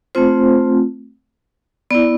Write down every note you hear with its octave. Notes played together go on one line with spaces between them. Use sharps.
A3 C4 F4 C5
B3 E4 D5